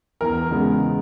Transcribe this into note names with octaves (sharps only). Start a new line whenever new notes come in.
E2 A#4
C#3 G#3 B3